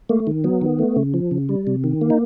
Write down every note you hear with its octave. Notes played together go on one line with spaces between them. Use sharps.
A3 A#3
D#3
F#3 B3
D#3
A3
C#3
F3
C#3
G3
C3
D#3
A#3
D#4